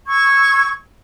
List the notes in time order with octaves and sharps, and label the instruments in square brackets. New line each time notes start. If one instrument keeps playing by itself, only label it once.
[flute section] C#6 E6 G#6